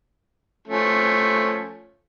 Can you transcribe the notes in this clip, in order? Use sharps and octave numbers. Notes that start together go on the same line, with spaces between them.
F3 A3 C#4